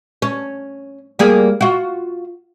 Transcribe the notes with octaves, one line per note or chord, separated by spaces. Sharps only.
C#4
G3 A#3 G#4
F4 F#4